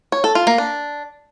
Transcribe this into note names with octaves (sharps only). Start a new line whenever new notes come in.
C#5
A4
F4
A#3
D4